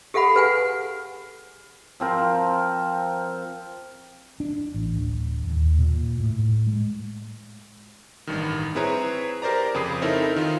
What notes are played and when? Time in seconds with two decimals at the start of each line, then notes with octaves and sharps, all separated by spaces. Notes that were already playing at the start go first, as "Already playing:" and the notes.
0.14 G4 A4 F5 F#5 B5
0.34 G#4 B4 F#5 G#5
2.00 F3 C4 A#4
4.40 D4
4.74 A1
4.96 D1
5.46 D#2
5.79 A#2
6.20 A2
6.67 G#3
8.27 A1 G2 D#3
8.75 C4 E4 G#4 B4 C#5 A#5
9.42 G4 A#4 C5 D5 A#5
9.74 F2 C#3 B5 D#6 C7
10.02 C4 D#4 E4 A4 A#4 C#5
10.36 D#3 F4